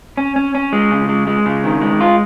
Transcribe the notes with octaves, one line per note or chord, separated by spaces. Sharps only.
C#4
C#4
C#4
G#3
C#3
G#3
G#3
C#3
D#3
G#3
F4